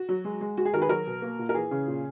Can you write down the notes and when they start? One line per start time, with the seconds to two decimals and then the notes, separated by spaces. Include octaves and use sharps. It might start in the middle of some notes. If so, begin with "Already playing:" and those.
Already playing: F#4
0.09 F#3
0.25 G#3
0.41 G#3
0.57 G#3 F#4
0.65 G#4
0.73 D#3 F#4 A#4
0.82 G#4 B4
0.89 F#3 F#4 A#4
1.07 B2
1.22 A#3
1.39 A#2
1.49 A#4
1.54 E3 G#4
1.71 C#3
1.88 A#2